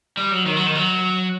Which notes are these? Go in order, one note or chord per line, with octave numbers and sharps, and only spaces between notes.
G3
F#3
D#3
F#3
D#3
F#3